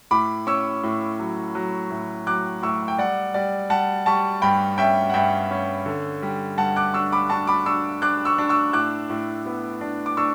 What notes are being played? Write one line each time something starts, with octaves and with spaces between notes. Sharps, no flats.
A2 B5 D6
C#4 C#6 E6
A2
F#3
F#3
A2
F#3 D6 F#6
A2 C#6 E6
G5
G3 D5 F#5
G3 D5
G3 F#5 A5
G3 A5 C#6
G2 G5 B5
C#4 E5 G5
F#5
G2 E5 G5
C#4
D3
G3
G2 F#5 A5
D6 F#6
D4 C#6 E6
B5 D6
D4 A5 C#6
B5 D6
D4 C#6 E6
D4 D6 F#6
C#6 E6
D4
C#6 E6
A2 D6 F#6
A2
B3
D4
D6
D4 C#6 E6